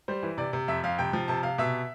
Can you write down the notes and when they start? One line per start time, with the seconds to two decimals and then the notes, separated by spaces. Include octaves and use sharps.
0.08 G3 C5
0.23 E3
0.38 C3 D5
0.53 C3
0.68 F2 E5
0.84 F2 F5
0.98 C3 G5
1.13 F3
1.28 C3 A5
1.43 C3 F5
1.58 B2 E5